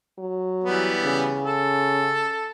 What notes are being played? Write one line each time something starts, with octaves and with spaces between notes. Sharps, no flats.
F#3
E3 G3 B3
C#3
A4